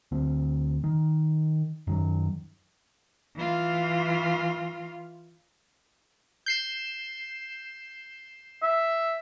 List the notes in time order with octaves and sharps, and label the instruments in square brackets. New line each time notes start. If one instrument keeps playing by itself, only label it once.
[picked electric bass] D2 C4
D#3
F#2 D#3 F#3
[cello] E3 F4
[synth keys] G6 C7 E7
[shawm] E5